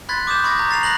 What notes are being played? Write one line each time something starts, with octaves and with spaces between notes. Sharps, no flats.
B5 C6 F#6 G#6 A6 B6
D6 D#6 G6 E7
B5 C#6 D6 G#6 A#6
A#5 G6
B5 A6 C7 F7
B5 F#6 A#6 F#7